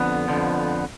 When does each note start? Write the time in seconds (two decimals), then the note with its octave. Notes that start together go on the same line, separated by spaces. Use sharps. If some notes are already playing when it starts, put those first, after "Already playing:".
Already playing: F2 D3 B3
0.28 F2 D3 F3